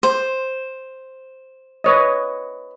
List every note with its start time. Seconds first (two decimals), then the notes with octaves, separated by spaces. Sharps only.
0.03 C5
1.84 B4 C#5 D#5